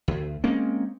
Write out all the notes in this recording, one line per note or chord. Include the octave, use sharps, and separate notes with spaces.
D2
G#3 A#3 C4 C#4